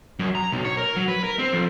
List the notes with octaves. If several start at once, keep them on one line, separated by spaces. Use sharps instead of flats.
F#2
A#5
B1
C#5
A#4
F#3
B4
A#4
C4
F2